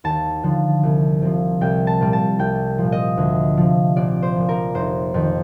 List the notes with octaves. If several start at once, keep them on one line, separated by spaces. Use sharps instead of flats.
D#2 A5
D3 F3
C2
C3 F3
C2 G5
A5
A#2 G3
A5
C2 G5
A#2 F3
D#5
D2
C3 F3
A#1 D5
C5
A#2 F3
A#4
F1 C5
F2 D#3